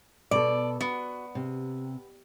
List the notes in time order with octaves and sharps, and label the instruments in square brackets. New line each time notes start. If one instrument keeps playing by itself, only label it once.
[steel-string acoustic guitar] B2 A4 [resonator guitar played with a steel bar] D5
[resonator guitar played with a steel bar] B3 [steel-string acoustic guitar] F#4
[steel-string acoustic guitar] C3